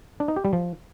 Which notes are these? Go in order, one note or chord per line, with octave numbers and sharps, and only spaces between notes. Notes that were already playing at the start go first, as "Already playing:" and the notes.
D4
D#4
G4
G3
F3